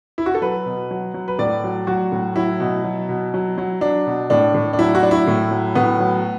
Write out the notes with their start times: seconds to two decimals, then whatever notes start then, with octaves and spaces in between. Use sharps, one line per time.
0.18 E4
0.26 F#4
0.35 A4
0.42 F#3 B4
0.66 B2
0.91 F#3
1.14 F#3
1.28 B4
1.39 A2 D5
1.64 F#3
1.87 F#3 F#4
2.12 A2
2.36 F#3 E4
2.60 B2
2.84 F#3
3.09 B2
3.34 F#3
3.58 F#3
3.81 F#3 D4
4.07 B2
4.30 A2 D4
4.54 A2
4.73 D4
4.79 F#3 E4
4.95 F#4
5.03 F#3 D4
5.11 E4
5.27 A2
5.51 F#3
5.75 A2 B3
6.00 F#3